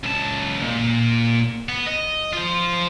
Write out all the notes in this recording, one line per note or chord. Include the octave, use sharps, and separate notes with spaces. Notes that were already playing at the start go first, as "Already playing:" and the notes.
C#2 A5
A#2
B3
D#5
F4 C5